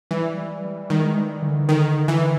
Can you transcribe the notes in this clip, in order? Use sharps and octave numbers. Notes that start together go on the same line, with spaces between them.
E3 G3
G3
G3
D#3 G#3
G3
D3
D3 D#3
E3